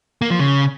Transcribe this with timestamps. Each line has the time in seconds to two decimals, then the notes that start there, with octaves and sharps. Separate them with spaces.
0.22 A#3
0.30 F3
0.39 C#3